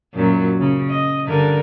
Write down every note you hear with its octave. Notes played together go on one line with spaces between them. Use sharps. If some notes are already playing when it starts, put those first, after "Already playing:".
F#2 A#2 F#3
C#3
D#5
G2 D3 A#4